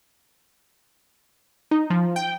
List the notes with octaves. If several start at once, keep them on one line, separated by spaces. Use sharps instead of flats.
D#4
F3
G5